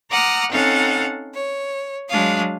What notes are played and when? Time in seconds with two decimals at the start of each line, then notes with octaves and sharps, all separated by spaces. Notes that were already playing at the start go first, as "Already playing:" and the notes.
0.10 F#5 A#5 D6 D#6 F6
0.50 C4 C#4 D#4 A4 F5 F#5
1.33 C#5
2.10 F#3 G#3 D4 F5 D#6